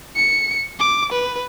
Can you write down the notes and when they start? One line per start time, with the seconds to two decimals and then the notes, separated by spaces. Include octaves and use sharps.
0.16 C#7
0.79 D6
1.12 B4